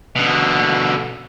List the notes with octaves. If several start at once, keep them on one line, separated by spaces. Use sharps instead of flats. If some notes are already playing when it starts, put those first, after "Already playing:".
B2 D3